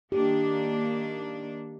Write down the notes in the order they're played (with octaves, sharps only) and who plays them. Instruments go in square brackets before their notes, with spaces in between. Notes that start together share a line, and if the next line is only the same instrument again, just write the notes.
[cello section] D#3 A#3 D4 [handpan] G4